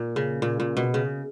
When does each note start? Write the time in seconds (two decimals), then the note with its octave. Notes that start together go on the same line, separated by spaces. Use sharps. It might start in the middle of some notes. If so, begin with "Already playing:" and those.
Already playing: A#2
0.16 C#3
0.42 A#2
0.60 A#2
0.77 B2
0.94 C#3